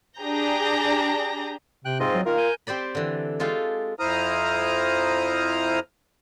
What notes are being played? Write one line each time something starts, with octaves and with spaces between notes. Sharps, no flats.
D4 G4 G#4 A#5 G6 A#6
C3 G5 F#6
G#2 C4 F4 D#5
F#3
D#3 A#3 F4 A#4
G#5 G6
C4 G4 C5 D5 B5
D3 E3
G#3 F4 G4 A4 F5
F2 E4 C5 A#5 D#6 F6